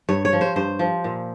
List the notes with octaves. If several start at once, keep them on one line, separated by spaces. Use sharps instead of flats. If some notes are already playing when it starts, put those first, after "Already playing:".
G2 C#5
C#5
F3
C5
G2 C5
F3
A#2